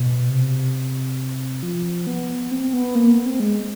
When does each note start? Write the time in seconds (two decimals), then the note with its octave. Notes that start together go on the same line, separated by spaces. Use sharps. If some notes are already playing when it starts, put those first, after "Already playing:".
Already playing: B2
0.29 C3
1.63 F3
2.07 B3
2.51 C4
2.73 B3
2.95 A#3
3.10 B3
3.25 C4
3.40 G#3